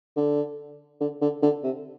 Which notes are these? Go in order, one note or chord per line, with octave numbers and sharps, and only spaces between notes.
D3
D3
D3
D3
C3